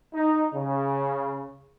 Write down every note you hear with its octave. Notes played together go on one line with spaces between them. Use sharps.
D#4
C#3